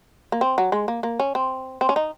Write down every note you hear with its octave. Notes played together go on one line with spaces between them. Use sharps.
A#3
C4
F#3
G#3
A#3
A#3
C#4
C4
C4
C#4
D#4